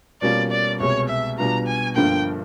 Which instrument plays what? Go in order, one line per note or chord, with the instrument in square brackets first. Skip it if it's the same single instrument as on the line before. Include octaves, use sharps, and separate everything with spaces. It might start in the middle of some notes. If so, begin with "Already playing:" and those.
[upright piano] B2 G3 A#3 C#4 F4 [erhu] D5
[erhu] D5
[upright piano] C2 B2 G#3 [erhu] C#5
[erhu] E5
[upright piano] B2 G3 B3 D4 F4 [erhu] A#5
[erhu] G#5
[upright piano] G1 G2 D3 F3 A#3 [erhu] G5